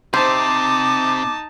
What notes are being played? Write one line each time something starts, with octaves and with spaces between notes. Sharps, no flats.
C3 D#4 C5 A5 D6